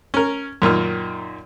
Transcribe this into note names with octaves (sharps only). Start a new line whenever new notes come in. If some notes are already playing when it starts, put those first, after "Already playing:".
C#4 A#4
F#2 A#2 D#3 F6